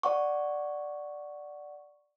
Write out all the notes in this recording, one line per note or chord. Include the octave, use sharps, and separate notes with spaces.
D5 F#5 C#6